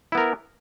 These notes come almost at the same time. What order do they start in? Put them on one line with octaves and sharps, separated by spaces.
E4 B3 A#4